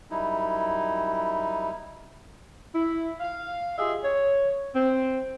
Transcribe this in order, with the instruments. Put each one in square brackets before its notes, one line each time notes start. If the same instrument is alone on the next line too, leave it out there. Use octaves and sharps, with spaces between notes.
[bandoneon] F#2 G3 D#4 E4
[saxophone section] E4
F5
F4 G4 G#4 D#5 E5
C#5
C4